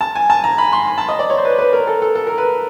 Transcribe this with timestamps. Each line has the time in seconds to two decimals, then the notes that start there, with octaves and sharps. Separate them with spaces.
0.01 A5
0.15 G#5
0.30 A5
0.44 A#5
0.58 B5
0.73 C6
0.87 B5
0.98 A5
1.09 D#5
1.19 D5
1.30 C#5
1.38 C5
1.45 B4
1.58 B4
1.73 A#4
1.87 A4
2.02 A4
2.15 A4
2.27 A#4
2.38 B4